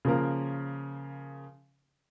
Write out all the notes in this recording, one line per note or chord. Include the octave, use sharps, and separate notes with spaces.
C#3 F3 A#3 A#4